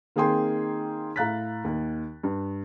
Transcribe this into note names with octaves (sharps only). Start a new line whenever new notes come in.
D#3 A#3 C4 G#4 G5 C6
A2 F5 A#5 F#6 A6 B6
D#2
G2